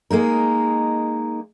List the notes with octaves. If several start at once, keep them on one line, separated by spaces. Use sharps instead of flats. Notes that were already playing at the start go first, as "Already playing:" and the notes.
G#3 A#3 D#4 A#4